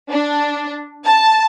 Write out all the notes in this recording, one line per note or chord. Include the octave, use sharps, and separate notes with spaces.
D4
A5